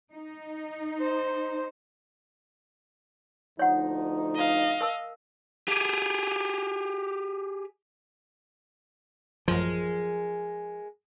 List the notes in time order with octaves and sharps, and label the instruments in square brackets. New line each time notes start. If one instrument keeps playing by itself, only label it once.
[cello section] D#4
[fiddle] C5
[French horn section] D2 F3 D#4 [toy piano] C#5 F#5
[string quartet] D#5 F5
[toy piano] A#4 A5 E6
[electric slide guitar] G4 G#4
[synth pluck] A1 F#2 [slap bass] F3 [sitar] G#3 A#4